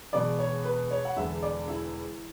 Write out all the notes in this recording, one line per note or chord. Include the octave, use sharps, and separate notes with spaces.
E1 E2 B2 D5
C#5
B4
C#5
F#5
E1 E2 D3 E5
D5
E4